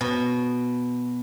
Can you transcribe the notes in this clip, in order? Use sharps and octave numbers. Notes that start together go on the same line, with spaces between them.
B2